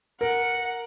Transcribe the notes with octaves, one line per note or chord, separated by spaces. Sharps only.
A#4 F#5